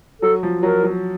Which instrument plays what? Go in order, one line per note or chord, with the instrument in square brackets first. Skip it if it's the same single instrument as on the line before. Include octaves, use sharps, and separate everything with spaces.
[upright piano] F#3 [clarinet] A4
[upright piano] F3
[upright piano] F#3 [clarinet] A#4
[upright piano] F#3